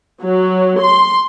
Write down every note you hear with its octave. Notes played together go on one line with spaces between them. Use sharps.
F#3
C6